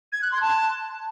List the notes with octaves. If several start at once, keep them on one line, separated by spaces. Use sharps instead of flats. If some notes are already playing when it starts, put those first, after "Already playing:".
G#6
F#6
C6
A5